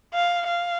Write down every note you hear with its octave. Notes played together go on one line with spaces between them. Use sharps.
F5
F5